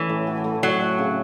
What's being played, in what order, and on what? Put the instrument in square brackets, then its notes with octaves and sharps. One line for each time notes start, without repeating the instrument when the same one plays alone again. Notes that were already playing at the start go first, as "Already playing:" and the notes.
Already playing: [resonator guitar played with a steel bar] E3 [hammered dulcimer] A3 C#4 A4
[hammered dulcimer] A2
F#4
A3
[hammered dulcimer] A2 [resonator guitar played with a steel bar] F#3
[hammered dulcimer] A2
C#3